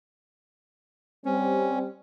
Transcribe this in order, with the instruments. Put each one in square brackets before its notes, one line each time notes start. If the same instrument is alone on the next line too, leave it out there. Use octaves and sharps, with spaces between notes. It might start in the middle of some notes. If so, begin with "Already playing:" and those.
[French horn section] G3 C4 [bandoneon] C#4